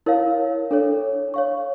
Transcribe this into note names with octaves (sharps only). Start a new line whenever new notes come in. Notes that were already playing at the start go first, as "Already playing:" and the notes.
E4 A#4 C#5 F5
D4 A4 C#5
C#5 F5 C#6